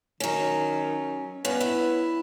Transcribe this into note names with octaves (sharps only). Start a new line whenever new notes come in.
D#3 F#3 C#4
G2 B3 C#4
E4